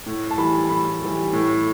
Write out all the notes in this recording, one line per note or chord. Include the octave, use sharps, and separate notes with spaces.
A2
A5
E3 G3 B5
A2 B5
E3 G3
A2